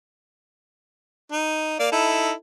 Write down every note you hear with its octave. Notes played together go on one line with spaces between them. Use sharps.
D#4
A#3 D5 F5
D#4 E4 A4